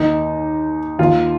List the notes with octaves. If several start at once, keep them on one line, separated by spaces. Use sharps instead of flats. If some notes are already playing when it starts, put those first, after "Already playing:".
Already playing: D#2 D#3 D#4
D#2 D#3 F4